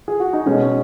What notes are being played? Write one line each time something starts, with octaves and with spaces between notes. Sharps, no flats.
G#4
F#4
D#4
B2 G#3 C#4